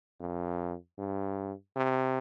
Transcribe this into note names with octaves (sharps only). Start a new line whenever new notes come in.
F2
G2
C3